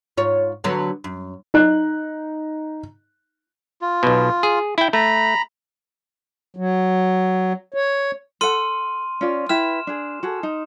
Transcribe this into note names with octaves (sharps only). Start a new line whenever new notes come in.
G#2 F4 C#5
D3 F#3 B3
F#2
D#4 F#6
F4
B1 B2
G#4
E4 G5
A3 A#5 B5
F#3
C#5
A4 F#5 C6 F6 D#7
C#4 F4 D5
E4 B4 G5 F6 E7
D4 G#4
F#4 G#4 A4
D#4